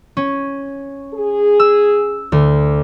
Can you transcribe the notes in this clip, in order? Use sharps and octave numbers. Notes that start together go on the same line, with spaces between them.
C#4
G#4
E6
D2